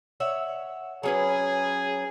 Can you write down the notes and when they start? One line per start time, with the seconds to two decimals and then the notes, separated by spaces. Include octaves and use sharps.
0.20 C#5 E5 F#5
1.03 F#3 C#4 G#4 B4